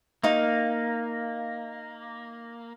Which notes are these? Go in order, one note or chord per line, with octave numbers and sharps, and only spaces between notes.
A#3 D#4 F5 C#6